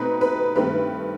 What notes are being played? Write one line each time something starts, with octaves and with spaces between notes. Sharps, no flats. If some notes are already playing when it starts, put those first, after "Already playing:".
Already playing: B2 A3 C4 D#4 B4
B4
G2 D#3 A3 C4 B4